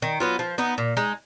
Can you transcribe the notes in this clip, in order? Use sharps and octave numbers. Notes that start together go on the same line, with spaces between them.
D#3
F#3 B3 F4
F3
B3 D#4
A#2
G#3 D#4